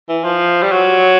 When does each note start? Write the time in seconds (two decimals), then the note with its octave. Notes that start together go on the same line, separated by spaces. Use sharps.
0.09 E3
0.24 F3
0.63 G3
0.72 F#3